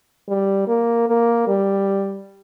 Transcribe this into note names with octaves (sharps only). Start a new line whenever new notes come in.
G3
A#3
A#3
G3